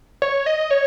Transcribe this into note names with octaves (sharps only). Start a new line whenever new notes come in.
C#5
D#5
C#5